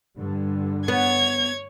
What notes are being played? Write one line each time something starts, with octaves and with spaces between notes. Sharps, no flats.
G2 D3
B3 C#5 G#6